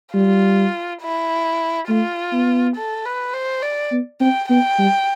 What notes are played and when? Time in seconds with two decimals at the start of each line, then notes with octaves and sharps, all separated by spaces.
0.14 G3 F4
1.02 E4
1.89 A3 F4
2.32 B3
2.76 A4
3.05 B4
3.33 C5
3.63 D5
3.92 B3
4.20 C4 G5
4.49 B3 G5
4.78 G3